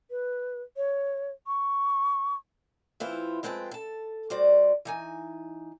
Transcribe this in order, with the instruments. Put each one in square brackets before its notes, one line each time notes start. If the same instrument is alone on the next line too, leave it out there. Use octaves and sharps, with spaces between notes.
[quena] B4
C#5
C#6
[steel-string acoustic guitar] E3 C4 E4 F4
F2 G#3 C4 B4 G5 A5
A4 A5
G3 F#4 C5 D5
E3 D#4 G#5